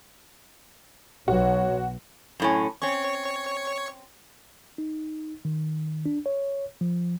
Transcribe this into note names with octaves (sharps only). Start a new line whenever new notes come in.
B1 F#4 C#5
F#2 A2 C#4
C4 C#4 C#5 C#6
D#4
D#3
D4
C#5
F3